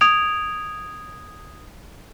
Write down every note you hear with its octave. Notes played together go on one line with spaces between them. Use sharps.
D#6 G#6 D7 F7